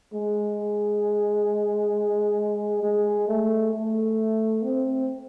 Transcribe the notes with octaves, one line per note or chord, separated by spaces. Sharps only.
G#3
G#3
A3
A3
C4